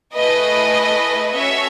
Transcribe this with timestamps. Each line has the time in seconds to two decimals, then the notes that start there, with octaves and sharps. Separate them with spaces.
0.15 A3 E4 G#4 B4 D#5
1.34 C#4 F#4 A4 C#5 E5